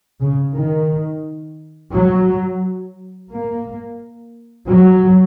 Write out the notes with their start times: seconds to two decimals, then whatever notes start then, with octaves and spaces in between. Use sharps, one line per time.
0.22 C#3
0.55 D#3
1.93 F#3
3.32 A#3
4.68 F#3